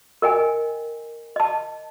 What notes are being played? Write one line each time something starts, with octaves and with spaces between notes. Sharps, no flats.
A#4 D#5 G5 G#5
D#5 A5